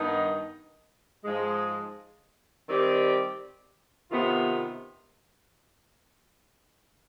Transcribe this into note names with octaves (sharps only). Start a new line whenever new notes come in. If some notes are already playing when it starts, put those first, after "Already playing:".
Already playing: G2 D#3 B3 D#4
G#2 F3 G#3
D#3 G3 C4 G4 D5
C3 D#3 B3 F4